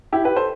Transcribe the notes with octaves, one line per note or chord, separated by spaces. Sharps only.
E4 G4
G4 B4
A4 C5